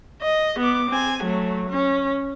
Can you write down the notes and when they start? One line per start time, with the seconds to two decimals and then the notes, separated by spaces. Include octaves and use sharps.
0.22 D#5
0.59 B3 D6
0.90 C4 G#5
1.23 F#3 A3
1.70 C#4